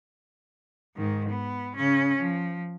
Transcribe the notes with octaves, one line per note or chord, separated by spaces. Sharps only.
G#2 D#3
B3
C#3 C#4
F3